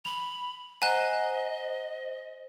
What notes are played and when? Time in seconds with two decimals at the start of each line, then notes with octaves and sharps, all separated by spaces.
0.05 B5 F7
0.82 C5 D#5 F#5 G#5 A#5 F#6 E7